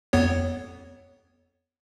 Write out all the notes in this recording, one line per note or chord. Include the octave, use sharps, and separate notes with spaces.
F2 B3 C#5